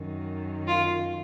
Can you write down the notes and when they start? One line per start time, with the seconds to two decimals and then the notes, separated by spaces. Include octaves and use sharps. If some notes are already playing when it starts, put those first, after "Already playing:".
Already playing: F#2 D#3
0.67 F4